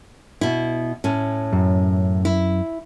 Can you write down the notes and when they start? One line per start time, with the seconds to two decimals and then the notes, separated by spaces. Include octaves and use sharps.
0.41 B2 E4
1.04 A2 C#4
1.52 F#2
2.25 E4